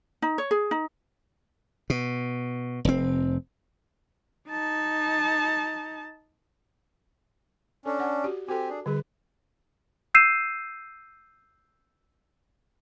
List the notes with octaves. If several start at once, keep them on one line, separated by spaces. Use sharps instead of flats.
D#4
C#5
G#4
D#4
B2
F1 C4
D#4 A5
C#4 D4 A4 A5
D5 F#5
F#4 G4
C4 F#4 G4 A4 G#5
D4 G#4
D3 G3 G#4 B4
E6 G6 C7 D#7 E7